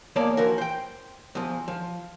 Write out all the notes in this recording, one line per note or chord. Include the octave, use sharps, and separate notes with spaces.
E2 A#3 C#5 D5 F5 A5
E3 F3 F#4 A#4
C5 G5
E2 F3
F3